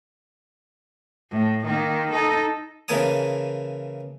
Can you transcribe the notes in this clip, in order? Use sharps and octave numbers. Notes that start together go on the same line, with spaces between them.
A2
D#3 A#3
D#4 A4
C#3 E3 A#3 G#5 A5 D#6